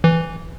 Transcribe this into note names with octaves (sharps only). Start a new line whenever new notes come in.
E3